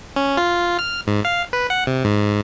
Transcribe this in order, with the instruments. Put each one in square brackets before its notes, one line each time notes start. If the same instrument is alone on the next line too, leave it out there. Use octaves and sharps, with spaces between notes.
[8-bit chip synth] C#4
F4
F6
G#2
F5
B4
F#5
C3
G#2